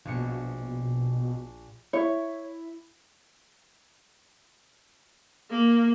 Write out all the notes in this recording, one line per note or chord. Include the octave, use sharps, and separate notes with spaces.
A#1 B2 C#7
E4 C#5
A#3